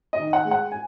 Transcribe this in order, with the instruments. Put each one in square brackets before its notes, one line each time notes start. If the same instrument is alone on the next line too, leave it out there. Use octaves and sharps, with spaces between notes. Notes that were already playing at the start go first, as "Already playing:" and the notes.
[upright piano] D#5
D#3
F#5
G#3
F#5
G#5